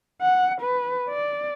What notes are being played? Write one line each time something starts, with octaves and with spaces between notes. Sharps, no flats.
F#5
B4
D5